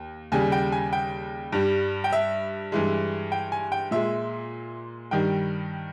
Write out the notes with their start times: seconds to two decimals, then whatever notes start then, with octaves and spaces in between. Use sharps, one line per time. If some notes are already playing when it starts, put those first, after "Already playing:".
Already playing: D#2
0.32 D#2 C#3 G3 G#5
0.52 G5
0.72 G#5
0.93 G5
1.52 G2 G3
2.04 G5
2.12 E5
2.72 G2 E3 G#3
3.32 G5
3.52 G#5
3.72 G5
3.91 A#2 G#3 E5
5.11 G2 D#3 G3 G5